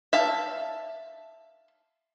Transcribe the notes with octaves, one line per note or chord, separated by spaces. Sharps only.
E5 F5 A5